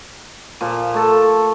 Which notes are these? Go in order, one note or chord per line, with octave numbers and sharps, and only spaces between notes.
A#2 F3
A3 A4